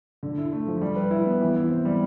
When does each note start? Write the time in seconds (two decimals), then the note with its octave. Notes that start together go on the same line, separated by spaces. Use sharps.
0.23 D3
0.38 E4
0.53 A3
0.67 F3
0.81 G3
0.96 B4
1.11 E4
1.26 B3
1.41 E3
1.56 E4
1.70 C4
1.85 G3